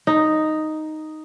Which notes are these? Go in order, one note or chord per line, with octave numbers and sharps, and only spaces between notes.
D#4